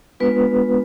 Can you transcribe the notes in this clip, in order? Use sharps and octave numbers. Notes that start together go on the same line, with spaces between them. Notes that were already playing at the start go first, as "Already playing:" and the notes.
G#3 B3 D4 F4 B4